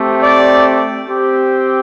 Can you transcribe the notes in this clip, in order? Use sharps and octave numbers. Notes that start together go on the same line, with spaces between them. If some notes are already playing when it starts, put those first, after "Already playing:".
Already playing: A3 C4 G4
D5
C4 G4